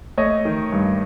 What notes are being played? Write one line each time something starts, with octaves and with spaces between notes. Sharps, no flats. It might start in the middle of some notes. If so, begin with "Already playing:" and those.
A3 C#5 D#5
D#3
G2